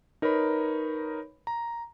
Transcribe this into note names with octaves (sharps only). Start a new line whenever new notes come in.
D#4 A#4 B4 C#5 B5
A#5